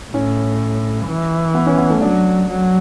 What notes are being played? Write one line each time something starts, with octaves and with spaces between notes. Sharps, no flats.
A2 C#4
E3
B3
C#4
B3
A3
F#3 D4
F#3